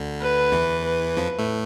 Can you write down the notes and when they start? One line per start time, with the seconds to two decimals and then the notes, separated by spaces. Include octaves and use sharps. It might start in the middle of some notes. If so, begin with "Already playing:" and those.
Already playing: D2 D3
0.20 B4
0.52 E2 E3
0.84 B4
1.17 F2 F3
1.38 A2 A3